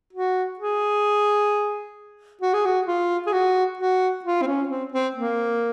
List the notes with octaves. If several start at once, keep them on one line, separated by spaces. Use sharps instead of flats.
F#4
G#4
F#4
G#4
F#4
F4
G#4
F#4
F#4
F4
C4
C#4
C4
C4
A#3